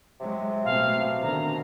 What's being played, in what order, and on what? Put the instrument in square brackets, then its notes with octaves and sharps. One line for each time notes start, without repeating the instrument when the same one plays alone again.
[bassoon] C3 [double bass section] F#3 G#3
[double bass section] B2 A3 C4 [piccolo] F5
[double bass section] B2 D3 D#3 [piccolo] A#5